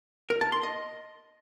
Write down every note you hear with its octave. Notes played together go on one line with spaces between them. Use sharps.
A#4
A5
C6
D#5